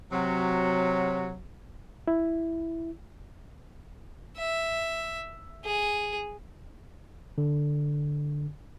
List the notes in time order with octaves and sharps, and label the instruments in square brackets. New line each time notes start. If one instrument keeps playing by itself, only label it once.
[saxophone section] C3 F#3
[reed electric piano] E4
[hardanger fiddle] E5
G#4
[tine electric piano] D3